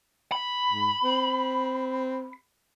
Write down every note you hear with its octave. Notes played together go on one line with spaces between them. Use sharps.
B5
G#2
C4